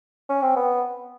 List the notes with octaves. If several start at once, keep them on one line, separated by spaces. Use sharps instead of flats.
C#4
C4
B3